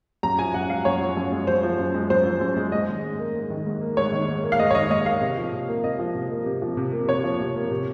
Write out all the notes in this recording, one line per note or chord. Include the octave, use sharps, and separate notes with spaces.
F#2 A#5
F3 G#5
F#2 F#5
G#3 F5
F#2 C#5
F3
F#2
G#3
F#2 C5
F3
F#2
G#3
F#2 C5
F3
F#2
G#3
G#2 D#5
D#3
G#2
A#3
G#2
D#3
G#2
A#3
G#2 C#5
D#3
G#2
A#3
F5
G#2 D#5
C#5
D#3 D#5
G#2 D#5
A#3 F5
C3
F3
C3
A#3
C3 D#5
F3
C3
A#3
C3
F3
C3
A#3
C3 C#5
F3
C3
A#3
C3